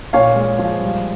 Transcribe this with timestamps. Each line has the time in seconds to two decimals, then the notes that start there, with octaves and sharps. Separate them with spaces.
0.13 A#2 C#5 F5
0.36 G#3
0.59 F3
0.82 G3